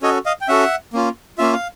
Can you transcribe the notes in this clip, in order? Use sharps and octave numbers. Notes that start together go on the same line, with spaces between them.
C#4 F#4 A4 C#5 D#5
D#5 F5
G5
C#4 F#4 A4 E5 F#5
A#3 C#4 F4
A#3 C#4 F4 E5
F5